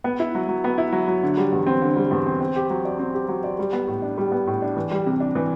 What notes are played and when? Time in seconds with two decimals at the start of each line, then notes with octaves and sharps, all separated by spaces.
0.04 B3
0.20 E4
0.35 F#3
0.49 F#3
0.64 B3
0.78 E4
0.93 F#3
1.08 F#3
1.23 D3
1.37 G3
1.52 E2
1.67 C4
1.82 D3
1.96 G3
2.11 E2
2.26 C4
2.41 C4
2.56 G4
2.70 F#3
2.85 D5
2.99 C4
3.14 G4
3.29 F#3
3.44 D5
3.59 G3
3.73 B3
3.87 A2
4.02 D4
4.18 G3
4.32 B3
4.47 A2
4.62 D4
4.77 E3
4.91 G3
5.06 C3
5.20 D4
5.35 E3